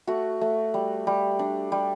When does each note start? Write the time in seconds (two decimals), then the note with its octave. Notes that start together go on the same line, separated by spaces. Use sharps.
0.07 A3 F#4
0.41 A3
0.74 G3
1.07 G3
1.39 D4
1.72 G3